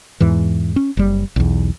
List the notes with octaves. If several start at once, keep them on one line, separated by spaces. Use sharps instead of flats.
E2 G#2 E3
C#4
F#1 G3
B1 E2